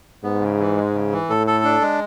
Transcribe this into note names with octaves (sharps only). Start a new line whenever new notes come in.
G#2 B3
C#3
E3
G#3
C#3
E3
A2 A4
A4
D4
G#3